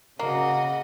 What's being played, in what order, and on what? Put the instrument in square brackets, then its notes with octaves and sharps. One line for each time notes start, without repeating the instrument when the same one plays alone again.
[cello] C#3 [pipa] A#3 [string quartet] F#4 D#5